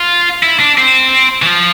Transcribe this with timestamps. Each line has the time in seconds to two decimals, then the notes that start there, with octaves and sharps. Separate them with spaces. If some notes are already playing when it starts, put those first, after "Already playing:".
Already playing: F4
0.43 E4
0.60 D4
0.78 C4
1.42 E3
1.46 F3